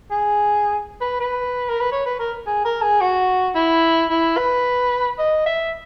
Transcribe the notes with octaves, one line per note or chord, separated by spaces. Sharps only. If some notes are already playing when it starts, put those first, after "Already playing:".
G#4
B4
B4
A#4
B4
C#5
B4
A#4
G#4
A#4
G#4
F#4
E4
E4
B4
D#5
E5